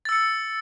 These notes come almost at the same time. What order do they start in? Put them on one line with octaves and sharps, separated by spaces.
A6 E6 C#7